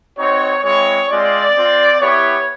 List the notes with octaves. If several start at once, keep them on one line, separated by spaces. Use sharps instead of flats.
C4 D#4 F#4 C#5
G#3 C4 E4 C#5
G#3 C4 F4 D5
C4 F4
B3 E4 G4 C#5